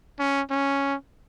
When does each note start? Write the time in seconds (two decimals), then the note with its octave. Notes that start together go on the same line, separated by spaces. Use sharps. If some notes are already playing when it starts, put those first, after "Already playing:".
0.19 C#4
0.51 C#4